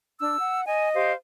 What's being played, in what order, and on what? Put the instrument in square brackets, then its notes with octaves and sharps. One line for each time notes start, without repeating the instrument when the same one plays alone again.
[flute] D4 [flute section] E6
[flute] F#5
[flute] D#5 [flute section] G#5
[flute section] G4 C5 F5